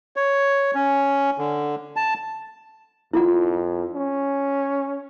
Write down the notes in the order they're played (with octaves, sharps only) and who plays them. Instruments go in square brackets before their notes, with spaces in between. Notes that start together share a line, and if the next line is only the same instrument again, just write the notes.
[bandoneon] C#5
C#4
D3
A5
[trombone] F2 [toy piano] E4 F4 F#5
[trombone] C#4